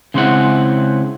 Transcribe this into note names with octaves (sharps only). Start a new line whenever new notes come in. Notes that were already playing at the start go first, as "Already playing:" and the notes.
C#3 G#3 C4 E4 F#5